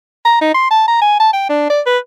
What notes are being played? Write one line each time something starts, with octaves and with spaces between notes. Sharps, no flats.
A#5
D#4
C6
A5
A#5
G#5
A5
G5
D4
D5
B4